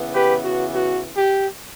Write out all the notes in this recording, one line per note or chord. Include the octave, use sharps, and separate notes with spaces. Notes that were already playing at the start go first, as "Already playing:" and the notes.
Already playing: C#3 E3 B3
G4 B4
F#4
F#4
G4